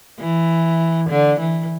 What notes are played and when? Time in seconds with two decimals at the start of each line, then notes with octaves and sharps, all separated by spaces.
0.20 E3
1.10 D3
1.40 E3